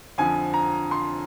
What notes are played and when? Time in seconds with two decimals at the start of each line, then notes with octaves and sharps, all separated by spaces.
0.18 F2 D3 F3 G#5
0.54 A#5
0.91 C6